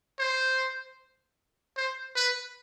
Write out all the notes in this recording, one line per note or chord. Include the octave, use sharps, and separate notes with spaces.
C5
C5
B4